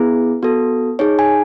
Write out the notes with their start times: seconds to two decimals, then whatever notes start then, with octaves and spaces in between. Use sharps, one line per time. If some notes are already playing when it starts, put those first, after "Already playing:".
Already playing: B3 E4 G#4
0.43 B3 F#4 A4
0.99 D#4 G#4 C#5
1.19 G#5